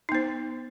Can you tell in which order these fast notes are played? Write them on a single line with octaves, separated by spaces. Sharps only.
D#4 B3 C5